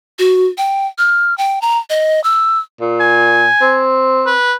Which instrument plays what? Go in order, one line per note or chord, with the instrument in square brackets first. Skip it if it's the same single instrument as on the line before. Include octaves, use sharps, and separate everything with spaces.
[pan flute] F#4
G5
F6
G5
A#5
D#5
E6
[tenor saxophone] A#2
[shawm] G#5
[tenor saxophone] C4
[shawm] B4